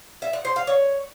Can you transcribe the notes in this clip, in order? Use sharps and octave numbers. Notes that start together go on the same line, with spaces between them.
E5
F#5
C5
F5
C#5